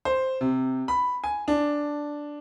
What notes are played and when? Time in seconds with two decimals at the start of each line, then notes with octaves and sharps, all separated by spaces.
0.05 C5
0.41 C3
0.88 B5
1.24 G#5
1.48 D4